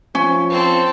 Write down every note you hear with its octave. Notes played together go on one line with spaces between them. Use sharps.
F3 C#4
C4 A4